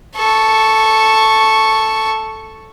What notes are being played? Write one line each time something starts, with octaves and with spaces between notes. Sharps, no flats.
A4 C#6